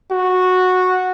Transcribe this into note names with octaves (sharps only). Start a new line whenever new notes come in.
F#4